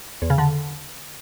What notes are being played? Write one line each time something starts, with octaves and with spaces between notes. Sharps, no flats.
E2
C#3
D3